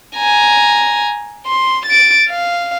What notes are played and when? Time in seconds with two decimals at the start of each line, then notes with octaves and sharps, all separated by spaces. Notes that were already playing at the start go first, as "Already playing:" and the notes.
0.16 G#5 A#5
1.46 C6
1.86 A6 D7
2.29 F5